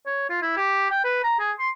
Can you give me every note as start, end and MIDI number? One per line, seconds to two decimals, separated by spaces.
0.06 0.27 73
0.29 0.39 65
0.42 0.53 64
0.57 0.90 67
0.91 1.04 79
1.04 1.23 71
1.24 1.37 82
1.39 1.52 68
1.59 1.69 84